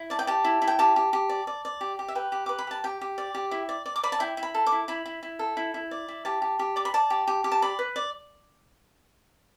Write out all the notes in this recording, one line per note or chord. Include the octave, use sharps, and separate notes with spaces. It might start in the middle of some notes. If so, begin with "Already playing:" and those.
Already playing: E4
D5 A5
G5
G4 A5
E4
E4
G5
G4 A5
G4
G4
D5
D5
D5
G4
G4
E5
B4 G5
G4
B4 D6
B5
G4 A5
G4 G5
G4
D5
G4
E4
D5
D5
D6
D5 B5
A5
E4 G5
E4
B5
A4
D6
E4
E4 B5
E4
E4
A4
E4
E4
D5
E4
G4 A5
G4
G4
D5 D6
B5
D5 A5
G4
G4
G4
A5
D5 B5
B4
D5